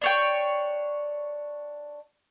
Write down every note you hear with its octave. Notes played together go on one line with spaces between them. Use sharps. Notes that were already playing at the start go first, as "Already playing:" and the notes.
D4 C#5 G5